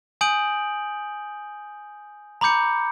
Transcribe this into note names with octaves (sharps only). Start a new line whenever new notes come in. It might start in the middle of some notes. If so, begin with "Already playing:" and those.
G#5 D#6 G6 D7 F#7
A#5 B5 D6 G6 C#7